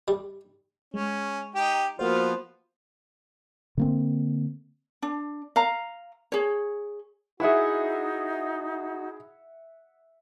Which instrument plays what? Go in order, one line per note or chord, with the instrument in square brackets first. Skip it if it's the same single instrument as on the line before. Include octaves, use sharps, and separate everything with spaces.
[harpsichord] G3
[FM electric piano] G#3 [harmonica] C#4
[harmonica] D#4 G4 G5
[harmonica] F3 B3 F4 [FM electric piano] A#3 F#4 C5
[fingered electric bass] D3 A#3 C4
[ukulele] D4
F5 A#5
G#4 C#5
[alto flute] D#4 [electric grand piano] E4 G#4 [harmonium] F#4 [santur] E5 F#5 E6